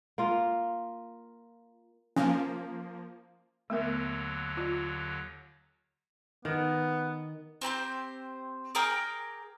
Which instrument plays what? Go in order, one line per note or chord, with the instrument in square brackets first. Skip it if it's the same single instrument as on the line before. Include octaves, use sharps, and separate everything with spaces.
[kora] A#3 F4
[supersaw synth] F3 A#3 [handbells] C#4
[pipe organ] D#2 D3 F#3 [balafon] A3 B3 A#4
[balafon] F4
[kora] D#3 [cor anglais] B3
[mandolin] C4 G4 B4 C5
G#4 A#4 G5 D6